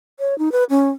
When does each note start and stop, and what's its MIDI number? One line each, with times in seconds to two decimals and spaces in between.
0.19 0.37 73
0.38 0.51 63
0.52 0.64 71
0.70 0.90 61